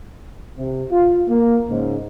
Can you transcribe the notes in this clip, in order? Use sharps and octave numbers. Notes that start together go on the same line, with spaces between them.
C3
F4
A#3
G#2 C#3